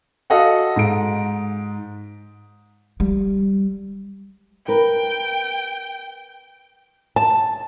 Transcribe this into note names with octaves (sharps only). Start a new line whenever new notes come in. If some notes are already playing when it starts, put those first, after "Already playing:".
F#4 A4 D#5 F5 F#5
G#2 D7
G3
A#4 B4 G5
A5